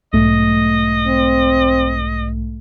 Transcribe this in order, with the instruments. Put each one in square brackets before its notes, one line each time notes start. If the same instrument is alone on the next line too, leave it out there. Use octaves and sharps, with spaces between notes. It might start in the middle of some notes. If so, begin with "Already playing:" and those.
[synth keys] B1 G#2 A3 [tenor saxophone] D#5
[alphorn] C4